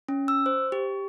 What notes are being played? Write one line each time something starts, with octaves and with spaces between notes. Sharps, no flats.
C#4
E6
C5
G4